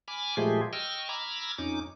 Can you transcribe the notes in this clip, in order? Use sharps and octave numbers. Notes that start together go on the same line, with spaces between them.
G#5 B5 D6 F6
A#2 F3 G#3 A3 G4 G#4
D#5 G5 C#6 E6 F6
A#5 B5 D6 E6 F6 G#6
F2 C#4 D#4 D6